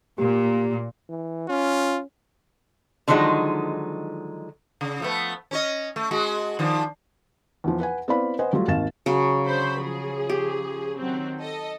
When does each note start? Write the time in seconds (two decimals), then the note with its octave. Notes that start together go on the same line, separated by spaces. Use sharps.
0.18 A#2 G4
1.09 E3
1.49 C#4 F4
3.08 D3 D#3 F3 F#3 G#3 D#4
4.81 C#3
5.00 F3 A3 B3
5.51 C#4 C#5 D#5
5.96 A3
6.11 G#3 F#4
6.59 D#3 F3 D4
7.64 E2 F3
7.80 B4 F#5 G#5
8.08 B3 C4 E4 D5 F5 B5
8.39 B4 C5 D#5 F#5 G#5
8.53 F#3 G3 A3 F4
8.68 G#1 D#2 F5 A6 E7
9.06 C#3 F#3
9.46 D3 C5 B5
9.79 F3 G#4
10.29 G4
11.00 D#3 F#3 C4
11.40 A4 D#5